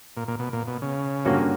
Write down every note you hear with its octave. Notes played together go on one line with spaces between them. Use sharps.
A#2
A#2
B2
A#2
B2
C#3
G2 D3 A#3 C#4 F#4